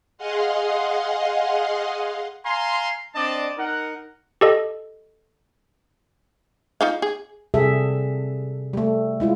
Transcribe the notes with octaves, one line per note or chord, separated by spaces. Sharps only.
G#4 D#5 F5 F#5 C6
F5 G#5 A#5 C6
C4 D4 D5 D#5 A5
D#4 A#4 F#5
G4 A4 D#5
D#4 F4 F5
G#4
C3 G3 G#4 A4 E5
G3 A3
G#3 E4 F4